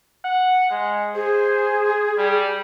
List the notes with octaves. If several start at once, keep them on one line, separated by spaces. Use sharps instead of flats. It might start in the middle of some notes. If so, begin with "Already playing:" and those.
F#5
G#3
G#4 C5
G3